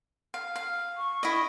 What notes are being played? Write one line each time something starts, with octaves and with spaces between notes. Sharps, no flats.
F5
F5
C#6
E4 D#5